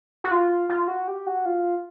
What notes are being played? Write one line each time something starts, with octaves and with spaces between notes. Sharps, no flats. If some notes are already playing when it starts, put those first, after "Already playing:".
F#4
F4
F4
F#4
G4
F#4
F4